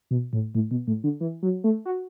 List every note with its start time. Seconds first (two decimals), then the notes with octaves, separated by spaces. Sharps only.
0.11 B2
0.33 A2
0.55 A2
0.71 B2
0.87 A2
1.04 D3
1.20 E3
1.42 F#3
1.64 A3
1.85 F#4